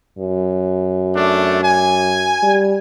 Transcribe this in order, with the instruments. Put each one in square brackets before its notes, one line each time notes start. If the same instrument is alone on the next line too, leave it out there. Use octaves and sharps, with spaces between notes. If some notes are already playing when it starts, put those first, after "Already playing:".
[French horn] F#2
[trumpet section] A3 D4
G#5
[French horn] G3